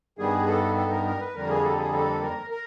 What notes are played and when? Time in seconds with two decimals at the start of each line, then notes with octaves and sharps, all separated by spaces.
0.19 G2 D#3 G3 B3 G#4
0.48 A4
0.76 A4
0.91 A#4
1.06 A#4
1.20 B4
1.34 F2 D3 G3 A#3 A#4
1.49 G#4
1.64 A4
1.78 G#4
1.93 A4
2.22 A#4
2.50 A#4